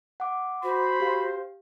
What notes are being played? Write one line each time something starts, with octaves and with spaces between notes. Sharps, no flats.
F#5 D6
F#4 C5 B5
G4 F5